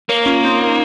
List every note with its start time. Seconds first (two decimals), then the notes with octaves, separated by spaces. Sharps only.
0.09 A#3 A#4 C#5
0.26 C#4 F4
0.44 C4 D#4
0.62 C4